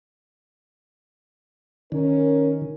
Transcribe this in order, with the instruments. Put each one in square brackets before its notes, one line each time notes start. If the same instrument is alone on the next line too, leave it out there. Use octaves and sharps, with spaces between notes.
[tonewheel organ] D#3 [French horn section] C#4 A#4